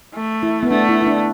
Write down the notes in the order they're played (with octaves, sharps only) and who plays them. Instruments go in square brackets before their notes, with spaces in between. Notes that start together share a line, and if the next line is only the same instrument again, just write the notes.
[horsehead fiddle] A3
[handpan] E4
B3
[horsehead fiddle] A3 [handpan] D4
[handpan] E4
E4
D4